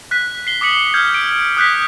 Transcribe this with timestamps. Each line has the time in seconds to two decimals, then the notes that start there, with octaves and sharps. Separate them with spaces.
0.11 F#6 B6
0.47 C7 G7
0.61 D6 D#6 B6 C#7 F#7
0.94 F6 G6 G#6
1.14 D7
1.57 D#6 F#6 G6 B6